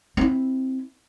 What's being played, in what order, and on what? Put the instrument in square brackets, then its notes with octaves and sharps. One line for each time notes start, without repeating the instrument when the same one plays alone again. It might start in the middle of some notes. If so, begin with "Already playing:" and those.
[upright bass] C4 E4